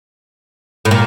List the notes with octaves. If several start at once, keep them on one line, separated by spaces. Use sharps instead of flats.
A2
A#2